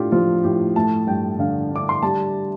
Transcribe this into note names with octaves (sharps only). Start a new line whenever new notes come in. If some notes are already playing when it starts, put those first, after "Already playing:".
Already playing: A2 D4 F4 G4 A4
F3 F4
A2 G4
A3 A5
G2 G5
D3 F5
D4 D6
C6
G3 A5